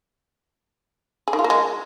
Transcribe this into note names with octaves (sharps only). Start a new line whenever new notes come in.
G#4
D#3
F4
A#3
G#3